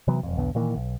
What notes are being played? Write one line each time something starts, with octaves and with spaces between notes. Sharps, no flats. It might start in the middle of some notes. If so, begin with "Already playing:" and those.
C3 E3 F#3 B3
E1 F2
B1 E2 D3 B3
A#2 D#3 E3 A#3
B1